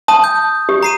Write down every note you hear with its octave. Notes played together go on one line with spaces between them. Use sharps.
A5 D#6
G6
G4
A#5 C7 D#7